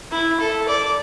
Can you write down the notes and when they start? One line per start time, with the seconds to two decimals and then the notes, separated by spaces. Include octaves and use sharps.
0.12 E4
0.40 A4
0.68 D5